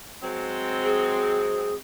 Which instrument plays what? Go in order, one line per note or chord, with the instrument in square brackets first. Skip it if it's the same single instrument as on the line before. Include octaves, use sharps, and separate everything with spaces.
[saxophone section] F#3 G#3 C4
[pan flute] G#4